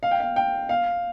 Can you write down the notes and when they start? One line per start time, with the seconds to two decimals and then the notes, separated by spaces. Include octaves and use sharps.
0.03 F5
0.11 G5
0.20 F5
0.36 G5
0.69 F5